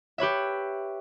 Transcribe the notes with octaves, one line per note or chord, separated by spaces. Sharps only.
G4 B4 C#5 E5